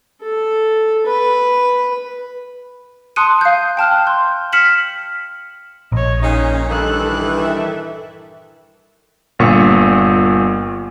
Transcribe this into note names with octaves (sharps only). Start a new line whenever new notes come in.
A4
B4
A5 C6 D#6 F#6 C#7 D#7
F5 G6
G5 A5 F6 F#6
C6 G6
F6 B6 C#7 E7 F#7
A#1 C#5 D#5
A#2 C#3 C#4 D#4
G2 D#3 E3 A4 F#6
A4 E5
G1 A#2 C#6